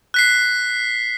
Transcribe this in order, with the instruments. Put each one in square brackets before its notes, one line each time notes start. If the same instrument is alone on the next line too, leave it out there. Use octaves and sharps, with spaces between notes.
[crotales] F#6 B6 C7